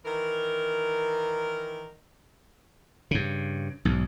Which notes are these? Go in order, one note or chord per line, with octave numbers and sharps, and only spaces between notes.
D#3 E3 A#4
G2 C#3
B1 G#2